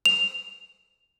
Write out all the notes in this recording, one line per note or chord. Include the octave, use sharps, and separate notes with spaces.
F7